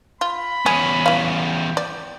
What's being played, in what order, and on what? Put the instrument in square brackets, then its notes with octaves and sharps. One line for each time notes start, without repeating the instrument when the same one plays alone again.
[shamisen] F4 [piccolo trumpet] B5
[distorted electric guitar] E2 C#4 [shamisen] G#4
[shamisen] E3 F5
[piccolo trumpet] G5
[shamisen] D5